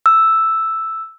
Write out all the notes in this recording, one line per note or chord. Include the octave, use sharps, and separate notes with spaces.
E6